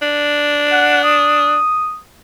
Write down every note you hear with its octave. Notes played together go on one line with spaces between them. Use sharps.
D4
F#5
D#6